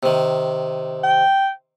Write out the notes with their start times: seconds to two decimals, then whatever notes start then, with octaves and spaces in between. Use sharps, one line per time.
0.03 C3 D#3
1.03 G5